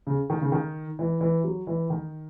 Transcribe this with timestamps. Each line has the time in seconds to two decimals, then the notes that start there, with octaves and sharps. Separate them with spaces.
0.07 C#3
0.30 D#3
0.42 C#3
0.52 D#3
0.99 E3
1.21 E3
1.44 F#3
1.67 E3
1.90 D#3